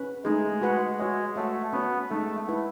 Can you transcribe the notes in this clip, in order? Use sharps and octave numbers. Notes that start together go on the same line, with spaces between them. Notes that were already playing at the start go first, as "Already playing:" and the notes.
Already playing: C#4 B4
G#3 A3 D#4 G#4
F#4 B4 F#5
G#3 F#4 C#5 E5
A3 F#4 C#5 F#5
B3 C#4 F#4 C#5 F#5
G#3 A3 D#4 A4
E4 B4 F#5